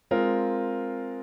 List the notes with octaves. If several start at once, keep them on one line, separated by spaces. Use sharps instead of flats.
G#3 C4 F4 A#4